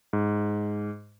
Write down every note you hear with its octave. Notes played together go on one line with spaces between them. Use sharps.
G#2